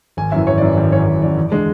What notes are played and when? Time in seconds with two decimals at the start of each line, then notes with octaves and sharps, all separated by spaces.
0.17 G#1 G#5
0.32 F#2 E3 E5
0.47 G#1 C#5
0.58 F#2 E3 D5
0.77 G#1 D5
0.92 F#2 E3 C#5
1.07 G#1
1.22 F#2 E3 D5
1.37 E2
1.52 D3 G#3 D4